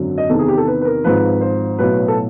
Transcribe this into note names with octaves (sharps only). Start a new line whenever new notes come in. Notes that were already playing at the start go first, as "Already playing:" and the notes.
Already playing: G#1 F#2 D3 F#3
D#5
E2 C3 D#3 A4
G#4
G4
A4
B4
B4
A#4
G#1 G#2 F3 B4
C5
B1 A2 F#3 B4
A4